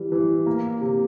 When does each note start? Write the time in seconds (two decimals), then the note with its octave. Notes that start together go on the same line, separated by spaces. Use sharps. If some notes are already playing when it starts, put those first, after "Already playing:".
Already playing: E3 G3
0.12 E3
0.46 A#3
0.81 C3